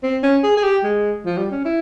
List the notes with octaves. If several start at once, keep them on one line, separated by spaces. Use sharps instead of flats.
C4
C#4
G#4
G#4
G4
G#3
F3
G3
C#4
E4